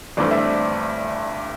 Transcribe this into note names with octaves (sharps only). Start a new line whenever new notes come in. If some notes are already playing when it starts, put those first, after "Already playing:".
G1 G2 E3 A3 C4 D5
E5
D5